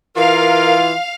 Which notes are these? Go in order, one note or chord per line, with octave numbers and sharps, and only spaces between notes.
E3 F4 A#4 F5